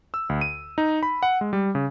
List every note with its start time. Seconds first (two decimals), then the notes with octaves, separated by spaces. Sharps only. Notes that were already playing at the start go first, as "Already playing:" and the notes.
0.14 E6
0.29 D2
0.41 D#7
0.78 D#4
1.03 B5
1.23 F#5
1.41 G#3
1.53 G3
1.75 C#3